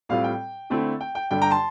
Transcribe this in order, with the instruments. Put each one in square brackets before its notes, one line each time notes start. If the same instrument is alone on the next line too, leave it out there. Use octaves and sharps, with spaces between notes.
[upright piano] A2 G3 C4 F4 F5
G5
D3 A3 C4 E4
G5
G5
G2 D3 G3 G5
G5 A#5
A5 C6